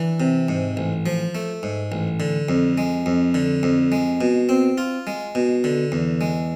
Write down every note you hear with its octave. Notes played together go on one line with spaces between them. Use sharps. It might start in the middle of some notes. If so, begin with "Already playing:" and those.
Already playing: E3 D4
C3
G#2
A1
F3
A3
G#2
A1
D3
F2
G#3
F2
D3
F2
G#3
B2
C4
F4
G#3
B2
D3
E2
G#3